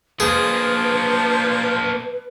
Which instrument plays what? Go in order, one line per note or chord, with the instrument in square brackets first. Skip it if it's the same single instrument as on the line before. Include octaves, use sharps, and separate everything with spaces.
[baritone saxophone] F3 [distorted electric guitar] A#3 D4 [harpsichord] G#4 [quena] B4